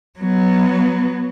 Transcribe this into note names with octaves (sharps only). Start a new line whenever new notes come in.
F#3 B3